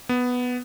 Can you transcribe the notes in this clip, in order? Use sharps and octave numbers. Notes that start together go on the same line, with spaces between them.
B3